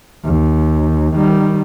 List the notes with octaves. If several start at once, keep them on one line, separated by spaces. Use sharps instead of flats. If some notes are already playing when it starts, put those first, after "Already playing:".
D#2
D#3 G3